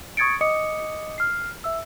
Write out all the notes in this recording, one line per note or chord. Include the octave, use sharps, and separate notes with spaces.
C#6 D#6 G#6 A6 C#7 D7
D#5 D6 D#6 C#7
F6 C7
E5 E6